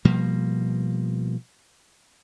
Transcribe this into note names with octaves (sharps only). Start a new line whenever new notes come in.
B2 F3 G3 A#3